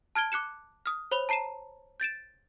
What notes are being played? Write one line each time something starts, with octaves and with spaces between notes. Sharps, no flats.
A5 F6 G#6 D7 G7
D6 F#6 C#7 E7
D#6 F6
C5 C#5 B5 F7 G7
A5 A#5 C7 D#7 E7
G6 A6 D7 E7